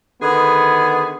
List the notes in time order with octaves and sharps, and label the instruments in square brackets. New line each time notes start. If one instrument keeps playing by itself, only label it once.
[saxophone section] D3 D#3 G#4 [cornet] B3